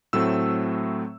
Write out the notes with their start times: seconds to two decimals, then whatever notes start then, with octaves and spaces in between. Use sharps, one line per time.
0.13 A2 F#3 A3 C4 E6